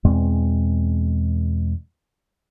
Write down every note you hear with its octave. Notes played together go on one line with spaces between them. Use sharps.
E2 B2 G#3 C4